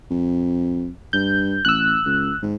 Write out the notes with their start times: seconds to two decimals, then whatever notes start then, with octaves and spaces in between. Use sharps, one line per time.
0.10 F2
1.13 G2 G6
1.65 A1 E6 F#6
2.06 C#2
2.43 G#2